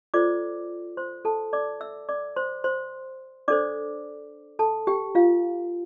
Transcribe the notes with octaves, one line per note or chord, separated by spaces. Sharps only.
F4 A4 C5 D5 D6
C5 C6
A4 A5
D5 D6
E5 E6
D5 D6
C5 C6
C5 C6
D4 A4 C5 D5 D6
A4 A5
G4 G5
F4 F5